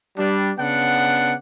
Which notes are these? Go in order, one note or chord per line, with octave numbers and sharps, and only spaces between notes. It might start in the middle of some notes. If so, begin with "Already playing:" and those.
G3 D4
C#3 B3 D4 F#5